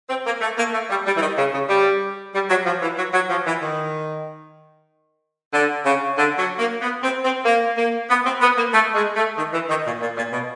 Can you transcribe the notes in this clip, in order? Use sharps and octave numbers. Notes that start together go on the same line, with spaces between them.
C4
A#3
A3
A#3
A3
G3
G3
E3
D#3
C#3
C#3
G3
G3
F#3
F3
E3
F#3
F#3
F3
E3
D#3
D3
C#3
D3
F#3
A#3
B3
C4
C4
A#3
A#3
B3
C4
B3
A#3
A3
G#3
A3
D#3
E3
D#3
A#2
A#2
A#2
B2